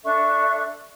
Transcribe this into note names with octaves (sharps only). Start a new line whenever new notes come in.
D4 A4 E5 C#6